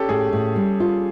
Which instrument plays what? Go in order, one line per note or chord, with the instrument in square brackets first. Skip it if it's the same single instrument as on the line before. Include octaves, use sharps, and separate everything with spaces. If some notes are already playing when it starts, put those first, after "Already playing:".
Already playing: [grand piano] C#4 G4 A4
[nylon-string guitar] A2 [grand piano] G#4
[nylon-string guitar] A2
G3
F4